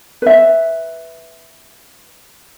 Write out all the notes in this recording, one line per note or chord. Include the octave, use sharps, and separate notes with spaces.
B4 E5